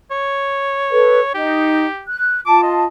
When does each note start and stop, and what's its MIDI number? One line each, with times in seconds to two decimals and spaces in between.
0.11 1.33 73
0.91 1.20 69
0.91 1.20 71
1.35 1.85 63
1.35 2.04 67
2.08 2.40 90
2.46 2.84 65
2.46 2.84 81
2.46 2.61 86
2.63 2.85 75